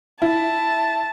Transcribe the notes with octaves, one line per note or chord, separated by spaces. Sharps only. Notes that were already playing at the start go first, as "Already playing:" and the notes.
E4 A5